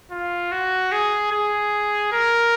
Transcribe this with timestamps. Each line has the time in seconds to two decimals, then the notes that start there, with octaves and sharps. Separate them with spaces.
0.11 F4
0.52 F#4
0.92 G#4
1.32 G#4
2.12 A#4